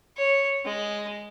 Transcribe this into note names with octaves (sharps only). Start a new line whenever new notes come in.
C#5
G#3